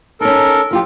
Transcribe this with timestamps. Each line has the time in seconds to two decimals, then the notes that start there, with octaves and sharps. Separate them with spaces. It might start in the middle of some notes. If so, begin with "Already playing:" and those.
0.21 C#4 D#4 A4 A#4
0.71 F3 F4 G4